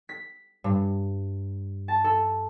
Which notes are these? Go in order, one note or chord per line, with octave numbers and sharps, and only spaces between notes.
B6
G2
A5
A4